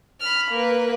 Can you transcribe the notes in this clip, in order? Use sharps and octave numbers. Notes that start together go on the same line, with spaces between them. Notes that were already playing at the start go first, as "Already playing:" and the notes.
B5 F6
A#3 B4